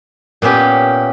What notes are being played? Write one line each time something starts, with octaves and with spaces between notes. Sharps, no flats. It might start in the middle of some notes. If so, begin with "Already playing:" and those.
A#2 B3 C#4 G4